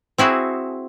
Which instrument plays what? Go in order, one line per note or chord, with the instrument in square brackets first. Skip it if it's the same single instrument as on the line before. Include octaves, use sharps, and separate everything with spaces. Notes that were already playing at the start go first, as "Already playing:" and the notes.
[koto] C4 E4 F#4 G#4